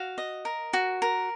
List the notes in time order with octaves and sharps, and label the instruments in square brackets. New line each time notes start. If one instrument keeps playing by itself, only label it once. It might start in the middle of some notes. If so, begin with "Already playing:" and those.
Already playing: [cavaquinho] F#4 F5
D#5
A#4
F#4
A#4